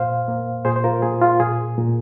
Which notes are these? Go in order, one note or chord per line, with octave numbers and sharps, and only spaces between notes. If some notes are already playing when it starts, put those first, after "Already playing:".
Already playing: A#2 C5 F5
A#3
A#2 G#4 C5
C5
F4 A#4
A#3 G#4
F4
A#2 G#4
A#2